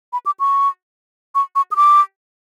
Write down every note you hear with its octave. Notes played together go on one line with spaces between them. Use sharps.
B5
D6
C#6
C#6
C#6
D#6
D6